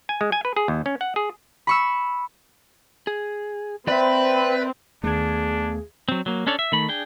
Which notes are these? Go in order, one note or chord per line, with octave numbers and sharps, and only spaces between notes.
G#5
G#3
G#5
B4
G#4
D#2
C#4
F#5
G#4
B5 C#6 E6
G#4
C4 B4 D5 E5
D#2 D#3 A3 B3 D4 G#4 G#6
F#3 C4
F#3 A#3
C#4 D4 A4 C#5 D5
E5
D#3 A3 B5
D4 G#4 G5